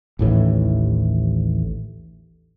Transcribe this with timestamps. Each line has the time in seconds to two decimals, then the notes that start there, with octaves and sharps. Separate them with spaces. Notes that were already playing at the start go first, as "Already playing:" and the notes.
0.19 A1 D#2 A2 E3